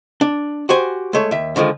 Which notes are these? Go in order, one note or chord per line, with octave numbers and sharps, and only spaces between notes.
D4
F#4 G4 C5 G#5
G#3 A3 C#5
D#2 E5
D3 D#3 F3 G#3